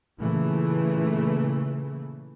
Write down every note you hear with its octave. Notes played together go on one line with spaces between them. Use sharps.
A#2 C#3 E3 A3